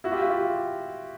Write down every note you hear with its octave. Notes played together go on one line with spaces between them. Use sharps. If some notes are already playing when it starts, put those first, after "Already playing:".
E4 F#4
F4 G4
E4 F#4
F4 G4